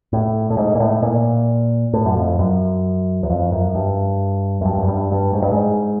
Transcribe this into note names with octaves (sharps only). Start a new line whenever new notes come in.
A2
A2
G#2
A#2
A2
A#2
A2
F#2
F2
F#2
E2
F2
F#2
G2
F#2
G2
F#2
G2
G2
G#2
G2
G#2